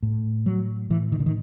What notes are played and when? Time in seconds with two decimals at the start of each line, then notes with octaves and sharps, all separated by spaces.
0.03 A2
0.46 F#3
0.90 A2 E3
1.12 D#3
1.20 D3
1.26 D#3